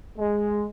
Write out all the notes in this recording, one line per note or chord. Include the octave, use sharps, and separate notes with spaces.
G#3